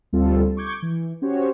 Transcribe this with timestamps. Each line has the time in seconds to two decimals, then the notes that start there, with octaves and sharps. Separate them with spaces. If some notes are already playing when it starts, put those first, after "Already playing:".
0.13 D2 G3 C4 F4 A4
0.57 C#6 D6 G6 G#6
0.82 E3
1.22 C#4 F#4 G4 C5 C#5